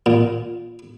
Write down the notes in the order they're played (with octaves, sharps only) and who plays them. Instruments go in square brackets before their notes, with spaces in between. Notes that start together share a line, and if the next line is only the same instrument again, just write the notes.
[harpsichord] A#2